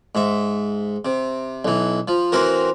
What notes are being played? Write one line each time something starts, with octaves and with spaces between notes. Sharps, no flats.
G#2 E5
C3
B1 E3
F3
E3 C4 F#4 A#4